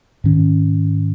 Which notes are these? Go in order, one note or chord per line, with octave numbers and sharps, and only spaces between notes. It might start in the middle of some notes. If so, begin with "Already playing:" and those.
G#2 D#3 C#4